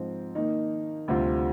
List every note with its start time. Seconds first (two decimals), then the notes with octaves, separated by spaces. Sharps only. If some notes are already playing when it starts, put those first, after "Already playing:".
Already playing: G#2 F3 C4
0.35 D#3 A#3 D#4
1.08 D2 C3 G3 C4 F4